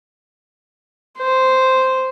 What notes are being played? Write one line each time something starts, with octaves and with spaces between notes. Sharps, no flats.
C5